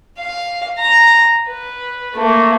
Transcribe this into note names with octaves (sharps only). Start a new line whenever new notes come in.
F5
A#5
B4
A3 A#3